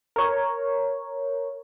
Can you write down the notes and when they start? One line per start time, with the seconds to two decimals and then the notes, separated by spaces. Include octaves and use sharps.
0.16 A#4 C#5